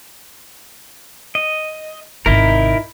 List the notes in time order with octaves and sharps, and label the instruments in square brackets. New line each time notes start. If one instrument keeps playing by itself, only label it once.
[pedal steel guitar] D#5
[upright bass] G#1 C3 [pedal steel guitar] D#4 E4 A#4